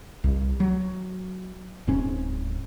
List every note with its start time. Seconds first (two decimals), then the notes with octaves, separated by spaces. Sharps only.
0.24 C2
0.60 F#3
1.87 D1 G#2 C4 C#4